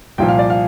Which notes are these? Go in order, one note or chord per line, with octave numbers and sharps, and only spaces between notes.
C2 A#2 F3 G5
F5
D5
F5